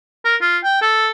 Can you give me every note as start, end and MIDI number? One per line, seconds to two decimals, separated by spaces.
0.25 0.36 70
0.41 0.58 65
0.64 0.81 79
0.82 1.10 69